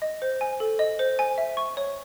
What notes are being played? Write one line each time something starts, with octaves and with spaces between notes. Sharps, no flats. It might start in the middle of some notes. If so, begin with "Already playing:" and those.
D#5
C5
G#5
A4
D#5
C5
G#5
E5
C#6
C#5